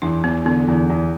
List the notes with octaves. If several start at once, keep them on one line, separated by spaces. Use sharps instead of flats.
E2 D4
E2 B3
D3 B3
E2
E2